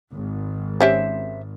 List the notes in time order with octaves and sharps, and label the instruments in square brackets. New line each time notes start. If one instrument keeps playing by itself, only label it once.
[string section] G#1
[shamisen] C4 C#4 G4 [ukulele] C5 E5